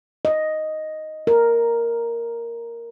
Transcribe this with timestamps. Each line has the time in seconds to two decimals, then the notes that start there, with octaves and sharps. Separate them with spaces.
0.25 D#5
1.27 A#4